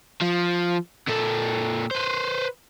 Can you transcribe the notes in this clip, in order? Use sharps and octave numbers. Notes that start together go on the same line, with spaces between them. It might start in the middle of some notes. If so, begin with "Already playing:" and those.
F3
A#2 A4
B4 C5